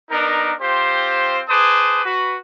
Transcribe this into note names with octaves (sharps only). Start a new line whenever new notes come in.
B3 D4 D#4 A#4
C4 F4 G4 C5
G#4 B4 C5 A5 D6 D#6
F#4 B4